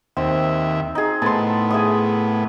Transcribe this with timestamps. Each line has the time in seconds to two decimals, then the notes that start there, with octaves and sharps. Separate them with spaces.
0.17 D#2 C4 E5
0.95 D#4 G#4
1.22 A2 B3 A5 C6
1.70 G#4 E5 D#6